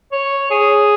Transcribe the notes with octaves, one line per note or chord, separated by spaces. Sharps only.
C#5
G#4